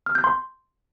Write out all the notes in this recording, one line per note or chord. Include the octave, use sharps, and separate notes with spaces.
F6
G6
C6